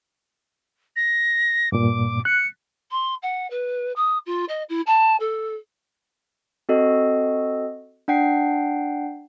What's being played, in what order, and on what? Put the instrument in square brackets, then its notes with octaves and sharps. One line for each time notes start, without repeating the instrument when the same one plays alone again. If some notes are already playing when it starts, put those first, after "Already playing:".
[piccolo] A#6
[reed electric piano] G2 A#2 [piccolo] D6
[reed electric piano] F#6 [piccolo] C#7
[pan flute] C6
F#5
B4
D#6
F4
D#5
E4
A5
A4
[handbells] C4 F#4 A4 D#5
D4 F#5 G5 C7